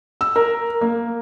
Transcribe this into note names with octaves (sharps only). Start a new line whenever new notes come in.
E6
A#4
A#3